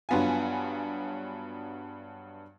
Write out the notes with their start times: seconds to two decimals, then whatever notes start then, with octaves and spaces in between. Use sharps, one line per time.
0.09 G2 F#3 B3 F4 G#5